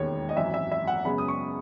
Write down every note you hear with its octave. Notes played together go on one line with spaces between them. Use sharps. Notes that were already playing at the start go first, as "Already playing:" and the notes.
Already playing: E1 D#2 D#3 G#3 B3 C#5
D#5
G#1 F#2 E3 E5
E5
E5
F#5
F#2 C#3 G#3 B3 B5
D#6
C#6